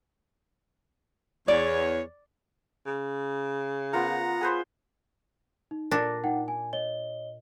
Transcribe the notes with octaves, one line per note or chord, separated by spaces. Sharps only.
E2 C#5 D5
C#3
B3 F4 A#4 F#5 A#5
G#4 B4 C5
D#4
A#2 D4 A#6
D#4 F#5 G5
G#5
C#5 D#5 G7